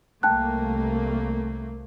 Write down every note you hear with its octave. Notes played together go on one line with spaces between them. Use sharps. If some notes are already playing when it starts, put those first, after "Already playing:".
C2 A3 A#3 G5 A5 F#6